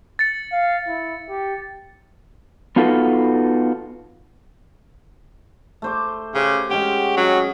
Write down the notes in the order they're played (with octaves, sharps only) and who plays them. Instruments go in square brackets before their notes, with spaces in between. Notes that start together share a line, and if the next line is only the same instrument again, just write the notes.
[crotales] A6 C#7
[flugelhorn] F5
E4
G4
[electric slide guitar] B3 D#4 F4 F#4 A4 B4
[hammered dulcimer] A3 C5 D6
[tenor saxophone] C#3 [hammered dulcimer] G4 C5
[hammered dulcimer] G#3 C#4 F#4 [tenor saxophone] G4
[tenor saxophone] F#3 [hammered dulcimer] C#4 D#5